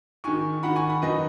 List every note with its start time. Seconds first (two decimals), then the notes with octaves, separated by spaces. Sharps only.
0.24 G#2 D#3 G#5 C#6
0.63 G#2 D#3 F#5 B5
0.76 G#5 C#6
0.89 F#5 B5
1.02 F#2 D#3 B4 D#5